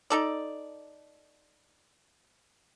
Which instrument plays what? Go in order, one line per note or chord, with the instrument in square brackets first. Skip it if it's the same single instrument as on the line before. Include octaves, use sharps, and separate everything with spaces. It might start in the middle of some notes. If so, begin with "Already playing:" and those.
[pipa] D#4 A4 D5